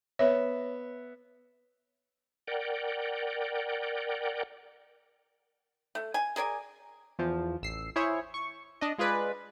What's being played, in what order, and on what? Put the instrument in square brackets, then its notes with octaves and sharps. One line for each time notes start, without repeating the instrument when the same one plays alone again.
[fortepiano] B3 E5 [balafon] C#5
[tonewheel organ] A#4 D5 F#5 G5
[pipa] A3
G#5
G#4 A#4 D5 G#5
[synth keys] E2 F3
A1 E6 C7
E4 G#4 C5 C#5 E5
C#6
D4 D#5
G#3 F4 G#4 B4 D5